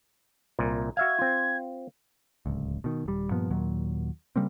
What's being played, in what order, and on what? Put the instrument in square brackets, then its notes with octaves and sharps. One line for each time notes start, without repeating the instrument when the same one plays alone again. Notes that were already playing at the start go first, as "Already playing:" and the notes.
[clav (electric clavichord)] C2 A#2
[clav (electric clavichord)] F#4 E5 F5 [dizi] G#6
[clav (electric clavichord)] C4 F4
[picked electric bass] D1 C#2
B2 D#3
D#1 G3
G2 A#2 F3 B3
D#2 A#2 F#3
C#3 G3 A#3 C4